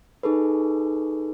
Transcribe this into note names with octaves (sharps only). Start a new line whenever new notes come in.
D#4 G#4 A4 B4